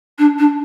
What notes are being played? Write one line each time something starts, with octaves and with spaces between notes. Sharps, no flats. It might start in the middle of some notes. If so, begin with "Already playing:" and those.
D4
D4